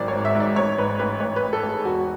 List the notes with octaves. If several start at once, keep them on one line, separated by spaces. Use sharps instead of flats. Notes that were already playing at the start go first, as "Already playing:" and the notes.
Already playing: G#1 F#3 D5
C#5
G#2
E5
G#2
D5
A1 C#5
G#2 B4
A1 B4
A1 C#5
B4
A1
A4
A1
G#4
E1 F#4